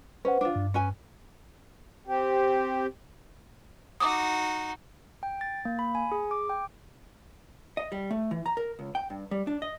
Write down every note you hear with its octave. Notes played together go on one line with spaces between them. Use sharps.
C#4 B4 C5 F#5
D4 F4
G2
C#4 B4 G#5
C4 G4
D#4 F#4 D6 D#6
G5
A6
A#3
B5
G#5
G#4
D6
G5
D#5
G3
A3
E3
A#5
A#4
C#2
G5
G2
G3
D4
D#5